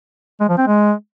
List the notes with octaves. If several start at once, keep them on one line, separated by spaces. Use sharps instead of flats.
G#3
F3
C4
G#3